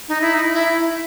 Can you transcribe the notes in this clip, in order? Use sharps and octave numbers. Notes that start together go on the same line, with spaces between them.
D#4
E4
D#4
E4